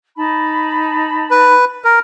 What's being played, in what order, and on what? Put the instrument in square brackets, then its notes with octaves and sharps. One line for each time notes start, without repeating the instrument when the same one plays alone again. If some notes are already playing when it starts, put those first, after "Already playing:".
[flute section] D#4 A5 B5
[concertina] B4
A#4